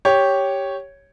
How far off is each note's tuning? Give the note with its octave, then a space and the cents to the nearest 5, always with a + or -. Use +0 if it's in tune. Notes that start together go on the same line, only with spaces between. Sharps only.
G4 +0 C#5 +0